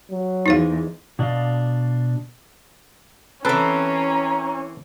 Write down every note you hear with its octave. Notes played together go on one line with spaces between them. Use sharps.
F#3
E2 G#3 D#4 C5 F5
B2 D4 D5 D#5 F5
E3 C4 C#4 A4 B4 A#5